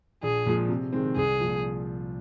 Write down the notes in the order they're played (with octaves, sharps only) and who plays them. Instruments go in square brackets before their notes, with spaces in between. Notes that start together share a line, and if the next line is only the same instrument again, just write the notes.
[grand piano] A#1 [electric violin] G#4
[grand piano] A#2 F3 G#3
C3
D#3 G#3 C4
[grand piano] C2 [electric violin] G#4
[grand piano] A#2 F3